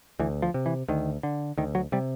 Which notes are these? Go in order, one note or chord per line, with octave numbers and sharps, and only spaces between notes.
D2 E3
F3
C3
E3
D2 D#3
D3
D2 D#3
F#3
C3 G3